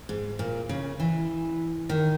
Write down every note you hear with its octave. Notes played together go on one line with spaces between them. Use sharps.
G#2
A#2
C#3
E3
D#3